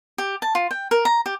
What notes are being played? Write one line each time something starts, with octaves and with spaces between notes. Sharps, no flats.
G4
A5
F4
G5
A#4
A#5
G4